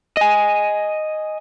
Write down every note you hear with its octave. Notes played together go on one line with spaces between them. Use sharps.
D#5 G#5